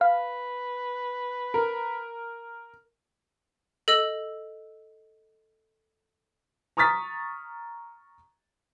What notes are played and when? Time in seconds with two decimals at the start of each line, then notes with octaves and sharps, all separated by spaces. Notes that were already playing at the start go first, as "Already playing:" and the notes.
0.01 B4 F5
1.54 A#4
3.88 A4 D#5 E6
6.77 A#5 C#6 D#6 F6 A6 B6